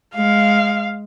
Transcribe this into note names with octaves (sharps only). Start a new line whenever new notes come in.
G#3 F5